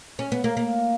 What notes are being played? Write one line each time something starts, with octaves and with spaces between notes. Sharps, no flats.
C#4
B3
A#3
A#3